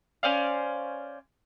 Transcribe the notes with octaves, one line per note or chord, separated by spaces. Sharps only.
C#4 C5 D5 F5